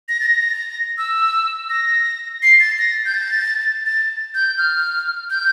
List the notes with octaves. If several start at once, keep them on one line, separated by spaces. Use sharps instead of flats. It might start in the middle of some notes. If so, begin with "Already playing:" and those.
A#6
A6
A#6
E6
A#6
C7
A6
A#6
G6
A6
A6
G6
F6
G6